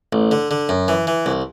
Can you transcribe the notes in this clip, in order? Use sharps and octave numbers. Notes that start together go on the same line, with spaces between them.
A1
D3
D3
F#2
E3
E3
C2